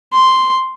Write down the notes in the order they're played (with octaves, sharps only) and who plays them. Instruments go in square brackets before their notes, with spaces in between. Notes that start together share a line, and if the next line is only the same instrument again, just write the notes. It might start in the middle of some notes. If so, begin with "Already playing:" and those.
[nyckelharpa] C6